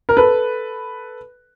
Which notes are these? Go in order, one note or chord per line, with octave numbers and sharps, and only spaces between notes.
A#4
A4 B4